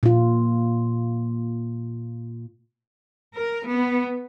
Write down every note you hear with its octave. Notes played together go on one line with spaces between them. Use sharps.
A#2 F4
A#4
B3